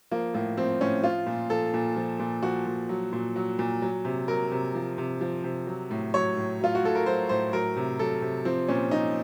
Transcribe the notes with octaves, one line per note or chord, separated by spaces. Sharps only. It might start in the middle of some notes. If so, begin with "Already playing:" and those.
F3 A#3
A2 A#3
F3 C4
A2 C#4
F3 F4
A#2
F3 A4
A#2
F3
A#2
F3 F#4
A#2
F#3
A#2
F#3
A#2
F#3
C3
F#3 A#4
C3
F3
C3
F3
C3
F#3
A2
F#3 C#5
A2
F#3 F4
F#4
A2 A4
A#4
F#3 C5
A2 C5
F#3 A#4
C3
F#3 A4
C3
F3 C4
A#2 C#4
F3 D#4